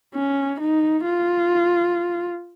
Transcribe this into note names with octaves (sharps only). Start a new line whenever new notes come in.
C#4
D#4
F4